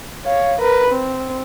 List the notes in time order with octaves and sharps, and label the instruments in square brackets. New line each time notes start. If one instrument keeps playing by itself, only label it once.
[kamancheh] C#5 F5
A#4 B4
C4